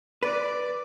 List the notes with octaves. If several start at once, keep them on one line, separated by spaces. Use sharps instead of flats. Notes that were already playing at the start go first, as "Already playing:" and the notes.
B4 D5